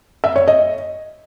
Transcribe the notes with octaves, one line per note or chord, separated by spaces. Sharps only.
E5
C#5
D#5